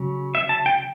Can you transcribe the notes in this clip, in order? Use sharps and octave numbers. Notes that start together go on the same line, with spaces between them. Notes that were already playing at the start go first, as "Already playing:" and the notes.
Already playing: C#3 F#3 C#4
E5
A5
G5